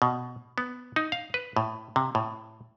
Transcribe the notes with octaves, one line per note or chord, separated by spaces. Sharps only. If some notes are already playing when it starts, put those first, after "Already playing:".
B2
B3
D#4
F5
B4
A2
C3
A2